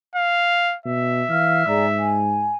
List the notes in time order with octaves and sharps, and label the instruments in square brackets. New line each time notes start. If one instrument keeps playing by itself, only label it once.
[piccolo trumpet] F5
[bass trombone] B2 [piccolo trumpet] E5
[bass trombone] E3 [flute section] F5 F6
[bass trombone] G#2 [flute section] G#4 D5 A#5
[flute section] G#5